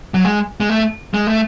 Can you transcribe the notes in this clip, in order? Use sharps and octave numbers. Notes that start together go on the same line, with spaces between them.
F#3
G#3
G#3
A3
G#3
A3